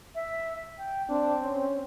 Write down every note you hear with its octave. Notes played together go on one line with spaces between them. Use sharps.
E5
G5
C4 D4
C#4